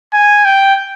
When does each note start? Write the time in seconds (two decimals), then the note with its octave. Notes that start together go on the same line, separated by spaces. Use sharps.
0.13 G#5
0.45 G5